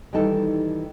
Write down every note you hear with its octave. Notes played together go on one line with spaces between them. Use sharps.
D#3 E3 G3 D#4 A4